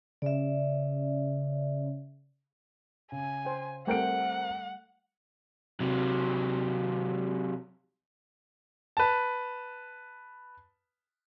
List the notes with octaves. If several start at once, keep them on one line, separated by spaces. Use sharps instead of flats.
C#3 D5 E5
C#3 G#5
C5 G5
G3 A3 C4 A#4 F#5 G5 D7
C3 F#3
B4 A5